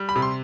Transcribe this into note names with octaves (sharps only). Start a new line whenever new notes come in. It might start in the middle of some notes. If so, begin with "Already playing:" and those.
Already playing: G3
B5
C3
C6